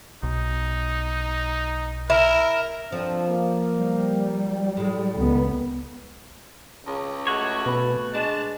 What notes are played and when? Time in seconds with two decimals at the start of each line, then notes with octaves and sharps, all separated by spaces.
0.23 B1 D#4
2.10 E4 A#4
2.92 F3 C4 D4 A4
3.28 A#3
3.75 G3
4.77 A2 G#3
5.17 C#2 D#3 B3
6.86 C#2 C#3
7.27 G#3 A3 F#4 C#5
7.66 B2 B4
8.14 G#3 D4 A5